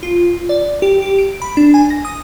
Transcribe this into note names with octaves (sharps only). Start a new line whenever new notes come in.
F4
D5
G4
G4
D7
B5
D4
G#5
A#6
D#6